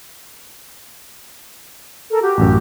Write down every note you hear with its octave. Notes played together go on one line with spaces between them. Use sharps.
A4 A#4
F#4 G4
A1 F#2